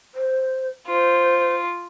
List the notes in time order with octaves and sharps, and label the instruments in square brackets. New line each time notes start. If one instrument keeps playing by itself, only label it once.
[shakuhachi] C5
[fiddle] F4 [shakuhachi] C5